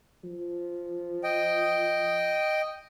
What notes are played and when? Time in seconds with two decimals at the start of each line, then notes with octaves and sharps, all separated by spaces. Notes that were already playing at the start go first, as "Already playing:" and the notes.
0.24 F3
1.24 D#5 G5